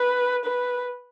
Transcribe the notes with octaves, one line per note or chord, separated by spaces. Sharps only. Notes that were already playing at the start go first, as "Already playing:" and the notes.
Already playing: B4
B4